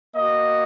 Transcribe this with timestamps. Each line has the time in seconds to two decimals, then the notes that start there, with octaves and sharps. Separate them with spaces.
0.15 A#3 F#4 D#5